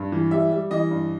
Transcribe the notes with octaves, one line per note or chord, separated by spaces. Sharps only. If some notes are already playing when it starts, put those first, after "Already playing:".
Already playing: G2
E3
G3 E5
G3
E3 D#5
G2